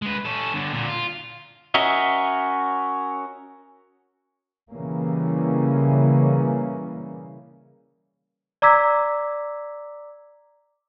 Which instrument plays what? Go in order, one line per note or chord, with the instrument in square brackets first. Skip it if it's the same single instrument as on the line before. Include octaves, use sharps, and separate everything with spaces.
[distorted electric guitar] G#3 B4
C#4 A4
G2 D3
A#2 D3
F4
[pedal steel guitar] C#4 F#4 A#4 D#5 E5
[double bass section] C#3 E3 G3 A#3 C#4
[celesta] D5 A#5 D6 E6 G#6 B6